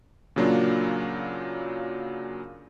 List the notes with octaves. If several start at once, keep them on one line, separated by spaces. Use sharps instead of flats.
A#2 C#3 F#3 A#3 D4 F4